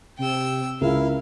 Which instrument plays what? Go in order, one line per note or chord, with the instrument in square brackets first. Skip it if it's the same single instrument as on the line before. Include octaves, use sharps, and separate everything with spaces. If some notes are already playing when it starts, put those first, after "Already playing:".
[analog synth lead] C3 [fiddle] G5 E6
[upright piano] C#2 C#3 A#4 [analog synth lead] E4 [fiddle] F5